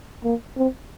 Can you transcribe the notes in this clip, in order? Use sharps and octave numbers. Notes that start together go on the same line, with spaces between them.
A#3
C4